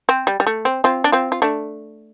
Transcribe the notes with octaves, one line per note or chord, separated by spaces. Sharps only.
C4
G3
G3
A3
C4
C4 F4
D4
C4 F4
F4
A3 D4